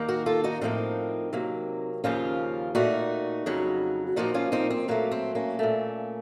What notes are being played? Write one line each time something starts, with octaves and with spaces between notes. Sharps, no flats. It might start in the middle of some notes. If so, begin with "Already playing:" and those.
Already playing: D#2 D#3 A#3
F#4 A#4
F4 A4
D#4 F#4
A2 F3 A#3 C4 D#4
C3 F#3 A#3
D#2 C#3 F3 A#3 C#4 F4
A#2 A3 D#4 F#4
F2 C#3 F#3
A#2 F3 A#3 D#4 F#4
C#4 F4
C4 D#4
C4
A#2 F#3 A3 A#3
C4
A#3 C#4
A#2 A3